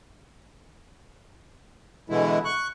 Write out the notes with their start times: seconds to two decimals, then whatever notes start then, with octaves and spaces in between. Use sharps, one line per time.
2.09 B2 D3 E3 G#3 E4
2.45 C#6 F#6